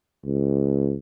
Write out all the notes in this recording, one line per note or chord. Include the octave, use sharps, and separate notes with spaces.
C#2